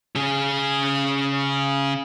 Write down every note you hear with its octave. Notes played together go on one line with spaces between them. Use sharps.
C#3 G#4